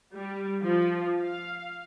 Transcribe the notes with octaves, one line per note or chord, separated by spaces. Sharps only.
G3
F3
F5